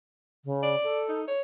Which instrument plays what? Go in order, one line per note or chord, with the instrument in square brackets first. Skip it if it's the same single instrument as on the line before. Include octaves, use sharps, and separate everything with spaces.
[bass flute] C#3
[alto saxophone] D5
[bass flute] A4
[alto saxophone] D#4
C#5